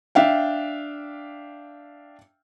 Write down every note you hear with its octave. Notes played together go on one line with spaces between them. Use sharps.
D4 E5 F5 G5